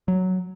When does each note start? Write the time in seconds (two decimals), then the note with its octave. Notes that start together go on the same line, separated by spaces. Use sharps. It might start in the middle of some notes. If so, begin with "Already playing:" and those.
0.08 F#3